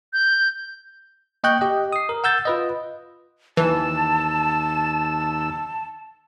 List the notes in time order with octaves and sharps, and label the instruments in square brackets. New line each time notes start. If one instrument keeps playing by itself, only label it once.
[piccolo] G6
[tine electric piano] A#3 D#5 G5 C#6 F#6 G6
G4 D#5
D#6 C7
A#4
F#5 E6 G6 A6
F4 B4 D#5
[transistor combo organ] D#2 E6 [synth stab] E3 [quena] A5